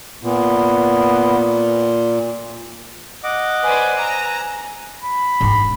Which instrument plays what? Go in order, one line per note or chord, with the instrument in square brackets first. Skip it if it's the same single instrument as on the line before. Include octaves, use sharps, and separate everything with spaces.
[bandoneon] A#2 [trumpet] B3
[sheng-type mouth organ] D#5 F#5 D6
[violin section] B4 C5 D5 [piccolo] G#5
[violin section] A#5 [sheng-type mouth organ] E6 F#6
[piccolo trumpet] B5
[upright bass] G#2 D4